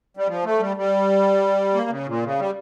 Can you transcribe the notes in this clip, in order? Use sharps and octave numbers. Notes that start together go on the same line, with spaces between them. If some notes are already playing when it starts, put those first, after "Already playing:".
G3
F3
A3
G3
G3
A#3
C#3
A#2
C#3
G3